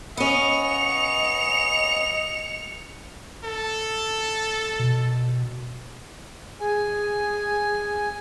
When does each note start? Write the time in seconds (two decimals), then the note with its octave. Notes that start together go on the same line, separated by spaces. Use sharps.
0.17 B3 C#4 D#5 C#7 F7
3.44 A4
4.79 B2
6.60 G#4 G#5